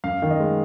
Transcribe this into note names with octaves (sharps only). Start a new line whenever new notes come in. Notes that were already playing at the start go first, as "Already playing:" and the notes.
F#2 F5
D#3
D#5
G#3